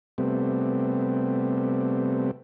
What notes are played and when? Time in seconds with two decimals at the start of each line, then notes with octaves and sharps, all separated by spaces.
0.18 C3 G3 A3 B3 C4